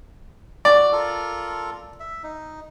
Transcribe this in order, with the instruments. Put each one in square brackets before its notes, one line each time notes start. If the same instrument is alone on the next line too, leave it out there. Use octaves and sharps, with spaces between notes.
[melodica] F#4 [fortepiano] D5
[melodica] F4 A4 A#4
E5
D#4